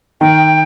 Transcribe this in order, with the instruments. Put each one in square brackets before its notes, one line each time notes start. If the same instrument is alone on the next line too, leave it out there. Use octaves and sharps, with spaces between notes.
[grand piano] D#3 [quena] G5